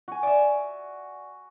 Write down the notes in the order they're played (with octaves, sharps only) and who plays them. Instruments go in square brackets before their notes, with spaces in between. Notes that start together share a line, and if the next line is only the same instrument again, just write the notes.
[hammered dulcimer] F#4 G#5
[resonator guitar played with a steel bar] D5 E5